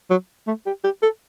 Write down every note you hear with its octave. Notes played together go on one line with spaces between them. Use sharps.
F#3
A3
G4
G4
A4